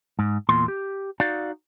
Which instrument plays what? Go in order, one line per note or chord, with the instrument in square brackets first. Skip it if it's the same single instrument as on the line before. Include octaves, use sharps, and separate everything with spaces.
[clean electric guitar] G#2
E2 A#2 C6
G4
D#4 F#4 D5 F5